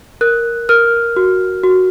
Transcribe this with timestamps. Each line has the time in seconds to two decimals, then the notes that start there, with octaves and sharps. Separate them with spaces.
0.21 A#4 F#6
0.69 A#4 F6
1.16 F#4
1.63 F#4